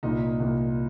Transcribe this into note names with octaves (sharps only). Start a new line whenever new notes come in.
C2 A#2 D#4
C2 A#2